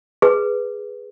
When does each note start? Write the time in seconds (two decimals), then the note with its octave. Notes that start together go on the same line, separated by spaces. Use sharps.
0.22 G#4 B4